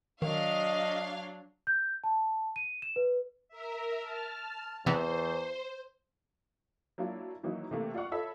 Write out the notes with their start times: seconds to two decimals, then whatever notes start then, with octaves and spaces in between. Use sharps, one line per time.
0.22 D#3 F#3 D4 D#5 F5
1.67 G6
2.04 A5
2.56 D#7
2.82 E7
2.96 B4
3.48 A#4 E5
4.02 A5 F6
4.86 E2 C3 E3 B3 C5
6.98 F#3 A#3 D4 E4 F4
7.43 D#3 E3 F#3 A#3 D#4 E4
7.71 C3 E3 A3 A#3
7.94 F4 D5 F5 F#5 C#6
8.11 F4 A4 C#5 E5 B5